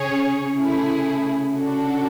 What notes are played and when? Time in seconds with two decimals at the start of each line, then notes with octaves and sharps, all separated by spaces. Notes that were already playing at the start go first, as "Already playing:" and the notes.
Already playing: C#3 C#4 G#4 C#5
0.58 A3 E4 G#4
1.53 D4 F#4 A4